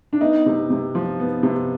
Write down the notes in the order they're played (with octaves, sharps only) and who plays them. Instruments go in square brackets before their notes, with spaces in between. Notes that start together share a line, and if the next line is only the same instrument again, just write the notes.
[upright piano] D4
B3 D#4
C3
C3
F3
B3
C3